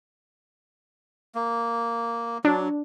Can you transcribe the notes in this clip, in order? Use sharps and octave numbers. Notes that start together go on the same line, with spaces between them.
A#3
F#3 D4